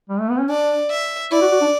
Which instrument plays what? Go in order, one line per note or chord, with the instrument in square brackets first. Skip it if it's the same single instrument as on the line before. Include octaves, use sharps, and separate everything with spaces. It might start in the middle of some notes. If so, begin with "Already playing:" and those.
[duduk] G3
A3
B3
C#4
[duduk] D4 [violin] D5
[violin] E5
[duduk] E4 [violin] D5
[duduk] F#4
F#4
D4